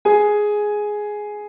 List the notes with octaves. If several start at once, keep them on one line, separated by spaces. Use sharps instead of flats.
G#4 G#5